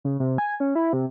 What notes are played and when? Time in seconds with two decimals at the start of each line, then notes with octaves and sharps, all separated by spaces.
0.05 C#3
0.20 C3
0.38 G#5
0.60 C#4
0.75 E4
0.93 C3